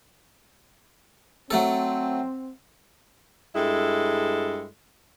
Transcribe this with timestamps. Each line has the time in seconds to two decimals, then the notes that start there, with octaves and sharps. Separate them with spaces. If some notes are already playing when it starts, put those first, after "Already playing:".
1.51 F#3 A3 C4 A4
3.55 G2 G#3 E4 A4